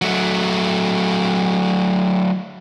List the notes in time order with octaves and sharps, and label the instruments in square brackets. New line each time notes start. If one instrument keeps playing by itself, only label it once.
[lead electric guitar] F#3 A3